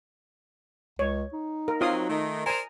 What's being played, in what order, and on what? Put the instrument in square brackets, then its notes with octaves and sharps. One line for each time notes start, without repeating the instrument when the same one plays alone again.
[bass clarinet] C#2 [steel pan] C#5
[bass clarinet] D#4
[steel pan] A#4
[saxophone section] F#3 C4 [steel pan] F4 F5 D#6
[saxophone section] D#3 A3
[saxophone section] A#4 C5 D5 [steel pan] G#5 A#5